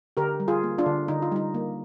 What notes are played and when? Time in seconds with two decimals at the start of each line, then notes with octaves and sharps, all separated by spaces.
0.17 D3 G4 A#4
0.40 G3
0.48 F4 G#4
0.64 A#3
0.78 D4 F4
0.86 D3
1.08 D3 D#4
1.22 F4
1.32 G3 D#4
1.54 A#3